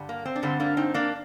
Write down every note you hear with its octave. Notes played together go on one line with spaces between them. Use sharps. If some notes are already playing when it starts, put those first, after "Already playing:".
Already playing: G2 D3 G3
A#3
C4
D4
G2 D3 G3 C4
A#3 D4
C4 D#4
A#3 D4